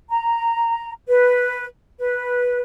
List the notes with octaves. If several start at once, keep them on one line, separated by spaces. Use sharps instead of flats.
A#5
B4
B4